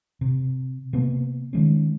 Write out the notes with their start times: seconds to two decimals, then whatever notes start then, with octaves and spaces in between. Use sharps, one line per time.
0.21 C3
0.93 C3 A#3 B3
1.53 D#3 G#3 C#4